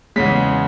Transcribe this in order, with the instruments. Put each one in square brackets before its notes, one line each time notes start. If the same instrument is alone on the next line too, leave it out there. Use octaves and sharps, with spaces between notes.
[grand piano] E2 C#3 G#3 B6